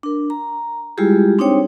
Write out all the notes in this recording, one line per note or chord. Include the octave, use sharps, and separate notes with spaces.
D4 A#4
A#5
G3 G#3 E4 F4 G4 G#4
C4 D4 D#4 C5 C#5 G5